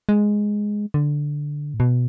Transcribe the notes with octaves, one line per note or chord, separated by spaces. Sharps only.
G#3
D3
A2
B2